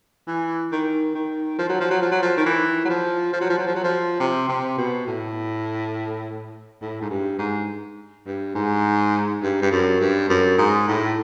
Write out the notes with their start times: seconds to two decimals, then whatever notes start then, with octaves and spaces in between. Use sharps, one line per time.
0.27 E3
0.72 D#3
1.15 D#3
1.58 F3
1.69 F#3
1.81 F3
1.90 F#3
2.02 F3
2.12 F#3
2.22 F3
2.37 D#3
2.46 E3
2.85 F#3
2.89 F3
3.33 F3
3.41 F#3
3.50 F3
3.59 F#3
3.67 F3
3.75 F#3
3.84 F3
4.20 C3
4.49 C3
4.78 B2
5.07 A2
6.82 A2
7.02 G#2
7.10 G2
7.39 G#2
8.27 G2
8.55 G#2
9.42 G2
9.62 G2
9.71 F#2
10.00 G2
10.29 F#2
10.58 G#2
10.88 A2